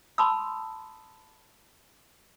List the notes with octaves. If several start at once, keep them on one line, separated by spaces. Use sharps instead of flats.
A5 B5 C6 D#6 E6